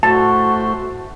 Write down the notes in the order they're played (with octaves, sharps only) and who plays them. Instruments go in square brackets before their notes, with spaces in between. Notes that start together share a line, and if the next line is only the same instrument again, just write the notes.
[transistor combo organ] A2 A3 C5 [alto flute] F#4 [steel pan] A5